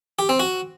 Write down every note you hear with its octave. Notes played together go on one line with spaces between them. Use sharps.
G4
C4
F#4